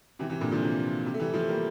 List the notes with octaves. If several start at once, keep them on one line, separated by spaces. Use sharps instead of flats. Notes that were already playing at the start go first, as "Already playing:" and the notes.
C3 E3
C3 E3
A#2 D3
D3 F3
C3 E3
C3
A3
E3 G3
F3 A3
G3 A#3